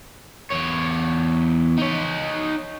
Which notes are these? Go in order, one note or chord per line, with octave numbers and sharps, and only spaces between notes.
E2 C#5
D#4 C#5